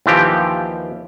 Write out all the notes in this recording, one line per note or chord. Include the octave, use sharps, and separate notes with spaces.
D#2 E3 F3 G4